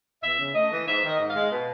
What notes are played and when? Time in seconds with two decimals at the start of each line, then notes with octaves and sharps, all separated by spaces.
0.23 E2 E5
0.39 C#3
0.55 A3 D#5
0.72 E3
0.88 G#2 E5
1.03 D#3
1.09 D#5
1.20 G#2
1.30 F5
1.36 G#3
1.51 B2 B4